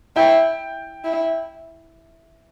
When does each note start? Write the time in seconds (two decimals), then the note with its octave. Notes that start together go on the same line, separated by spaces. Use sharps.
0.16 E4 G5
1.04 E4